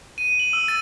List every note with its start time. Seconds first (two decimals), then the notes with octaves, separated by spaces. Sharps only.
0.18 D#7
0.40 F#7
0.53 E6
0.68 A6